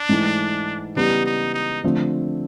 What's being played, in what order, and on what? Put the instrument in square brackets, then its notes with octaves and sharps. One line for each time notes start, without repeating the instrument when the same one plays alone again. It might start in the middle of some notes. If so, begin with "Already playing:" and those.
Already playing: [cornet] D4
[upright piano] G#2 E3 A3
[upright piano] C#3 E3 G3 B3 [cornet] D#4
[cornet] D#4
D#4
[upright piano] D3 F3 A3 C4